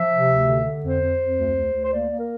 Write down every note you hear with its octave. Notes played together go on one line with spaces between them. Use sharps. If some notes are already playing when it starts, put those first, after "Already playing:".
Already playing: F3 E5
C3
D2
D3
D3
F2 C5
F2
F2
D2
D2
D2
C5
A#3 D5
A#3
A#4